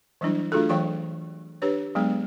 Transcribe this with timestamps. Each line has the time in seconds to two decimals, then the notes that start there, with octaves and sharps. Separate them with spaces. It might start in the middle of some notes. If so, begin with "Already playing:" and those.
0.21 E3 F#3 G3 D4 E4
0.52 A3 D4 F4 F#4 G#4 A4
0.69 E3 F#3 C#5 F5 G5 C#6
1.62 D4 G4 B4 C#5
1.95 F#3 G#3 B3 D4 G#4